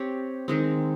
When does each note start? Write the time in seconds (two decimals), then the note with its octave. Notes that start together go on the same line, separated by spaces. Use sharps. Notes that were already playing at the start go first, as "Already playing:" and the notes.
Already playing: C4 G4 C#5
0.48 D#3 G#3 C4